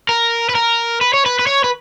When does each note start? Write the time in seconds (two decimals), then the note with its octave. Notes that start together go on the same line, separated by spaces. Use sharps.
0.09 A#4
0.49 B4
0.55 A#4
1.01 B4
1.14 C#5
1.26 B4
1.39 B4
1.47 C#5
1.64 B4